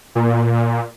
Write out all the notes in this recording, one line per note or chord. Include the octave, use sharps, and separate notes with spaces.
A#2